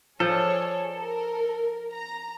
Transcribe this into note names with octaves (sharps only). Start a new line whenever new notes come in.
F3 G#4 A4 C#5 D5
A#4
A#5